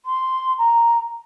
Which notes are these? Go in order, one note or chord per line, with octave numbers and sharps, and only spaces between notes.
C6
A#5